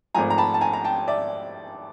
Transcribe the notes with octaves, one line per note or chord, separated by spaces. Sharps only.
G#1 G#2 F3 A3 G#5 A#5
A#5
A5 B5
A5
G#5 A#5
A#5
G5 A5
D5 E5